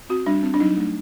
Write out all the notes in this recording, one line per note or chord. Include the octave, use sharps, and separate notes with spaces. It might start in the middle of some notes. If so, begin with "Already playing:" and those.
C4 F#4
G3 D4
C4
D4
F#3 D#4
A3 D4